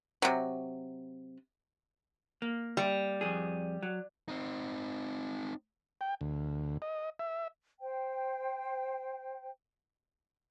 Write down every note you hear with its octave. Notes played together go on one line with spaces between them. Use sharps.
C3 F#3
A#3
G3
F2 G#4
F#3
C4 D#4
G5
D2
D#5
E5
C5 G5